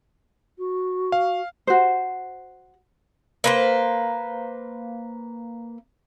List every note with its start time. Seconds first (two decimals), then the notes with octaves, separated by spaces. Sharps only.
0.59 F#4
1.12 F5
1.67 F#4 C5
3.44 A#3 B4 C5